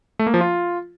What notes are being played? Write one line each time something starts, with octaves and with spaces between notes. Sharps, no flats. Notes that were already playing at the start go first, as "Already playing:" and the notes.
A3
A#3
F3
F4